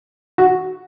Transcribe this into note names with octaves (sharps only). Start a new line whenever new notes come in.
F#4